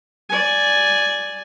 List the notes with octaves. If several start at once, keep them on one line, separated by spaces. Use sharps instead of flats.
D5 G#5